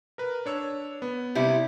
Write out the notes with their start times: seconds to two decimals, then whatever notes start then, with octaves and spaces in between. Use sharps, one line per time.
0.18 A#4 B4
0.46 D4 C#5 E6
1.02 B3
1.35 C3 G3 E4